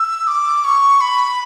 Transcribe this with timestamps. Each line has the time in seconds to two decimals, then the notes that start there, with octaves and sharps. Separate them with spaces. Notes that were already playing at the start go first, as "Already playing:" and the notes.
Already playing: E6
0.27 D6
0.64 C#6
1.01 B5